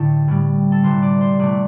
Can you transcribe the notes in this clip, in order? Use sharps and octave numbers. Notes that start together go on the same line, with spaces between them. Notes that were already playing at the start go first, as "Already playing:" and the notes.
Already playing: A2 D3 A3 E4 G4 A4
A2 G3
A4
C3 E3 G3 C5
D5
C5
C3 E3 A3 D5